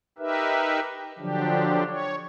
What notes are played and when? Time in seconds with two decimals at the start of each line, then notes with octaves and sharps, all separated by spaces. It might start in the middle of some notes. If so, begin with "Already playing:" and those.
0.19 D#4 G4 A#4 B4 E5
1.18 D3 F3 F#3 D4 G4
1.89 C#5